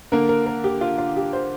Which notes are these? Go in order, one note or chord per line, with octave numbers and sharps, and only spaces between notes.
D3 A#3 A#4
A#4
A#4
G4
F4
F4
G4
C5